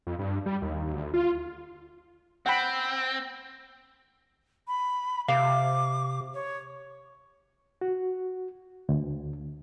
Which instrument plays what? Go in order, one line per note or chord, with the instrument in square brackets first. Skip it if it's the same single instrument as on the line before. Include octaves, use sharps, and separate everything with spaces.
[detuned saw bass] F2
G2
G3
D#2
D2
F4
[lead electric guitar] C4 [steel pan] F#5 G5 B5
[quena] B5
[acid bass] C3 [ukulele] F5 [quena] D6
[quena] C#5
[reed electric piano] F#4
D2